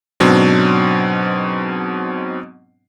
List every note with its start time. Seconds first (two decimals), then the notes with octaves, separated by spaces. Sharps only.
0.20 G#2 B2 F#3 C4 D4